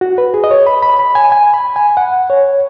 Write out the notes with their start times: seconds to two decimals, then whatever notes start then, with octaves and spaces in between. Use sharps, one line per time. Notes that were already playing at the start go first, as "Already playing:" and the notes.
0.01 F#4
0.18 B4
0.34 G#4
0.44 D#5
0.51 C#5
0.67 B5
0.82 B5
0.99 B5
1.15 G#5
1.32 G#5
1.54 B5
1.76 G#5
1.97 F#5
2.30 C#5